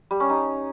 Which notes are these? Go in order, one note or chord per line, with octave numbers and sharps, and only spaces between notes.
G3
C#4
D#4